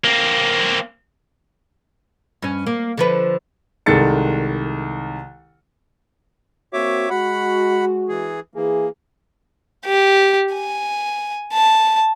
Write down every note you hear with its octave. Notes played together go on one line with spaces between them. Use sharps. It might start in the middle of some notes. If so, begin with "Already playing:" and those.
A#3 C4
G2 C#4
A#3
D3 F3 B4
C2 D#3 G#3 A4 A6 C#7
A#3 C4 F#4 C#5 E5 D6
G#3 F#4 F#5 B5
E3 G#4
E3 A#3 G#4
G4
G#5
A5